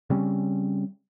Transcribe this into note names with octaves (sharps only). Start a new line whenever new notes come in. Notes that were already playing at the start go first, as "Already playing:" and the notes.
C#3 G3 C4 C#4